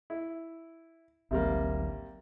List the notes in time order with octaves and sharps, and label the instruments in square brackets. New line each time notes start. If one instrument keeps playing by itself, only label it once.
[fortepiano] E4
[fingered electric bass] G#1 D2 F#3 [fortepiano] C3 G3 A#3